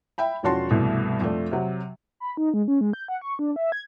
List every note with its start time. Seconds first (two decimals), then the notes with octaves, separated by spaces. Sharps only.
0.18 E5 G5 B5
0.43 E1 F3 C#4 F#4 A5 C6
0.70 C2 G2 B2 E3 A3
1.21 F2 F3 A3 D4
1.51 C3 F#3
2.20 B5
2.37 D#4
2.54 G#3
2.68 C#4
2.81 G#3
2.93 G6
3.08 F#5
3.21 C#6
3.39 D4
3.56 E5
3.72 G#6